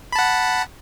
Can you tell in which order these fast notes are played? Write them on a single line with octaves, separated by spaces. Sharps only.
B5 A5 F#5